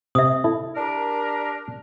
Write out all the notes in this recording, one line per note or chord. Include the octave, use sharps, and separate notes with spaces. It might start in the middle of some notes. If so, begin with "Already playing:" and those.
C3 E5 D#6
E4 A4
D4 G4 A#4